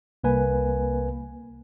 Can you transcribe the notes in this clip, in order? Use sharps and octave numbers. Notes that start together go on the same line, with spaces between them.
C2 A#3 B4 G#5